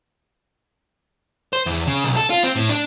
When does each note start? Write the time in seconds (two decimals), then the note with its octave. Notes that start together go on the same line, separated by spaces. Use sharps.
1.53 C5
1.66 E2
1.87 C#3
2.04 B1
2.17 A4
2.30 F4
2.44 C4
2.56 A2
2.69 D4